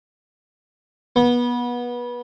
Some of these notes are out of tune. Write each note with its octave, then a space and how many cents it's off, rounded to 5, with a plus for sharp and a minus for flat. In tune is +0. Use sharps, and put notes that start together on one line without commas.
B3 -25